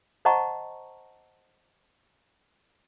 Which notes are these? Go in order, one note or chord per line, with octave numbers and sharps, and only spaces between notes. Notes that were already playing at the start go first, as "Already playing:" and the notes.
C5 D#5 F#5 A5 A#5 C#6